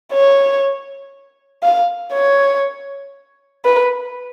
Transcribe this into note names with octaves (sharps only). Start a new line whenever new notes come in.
C#5
F5
C#5
B4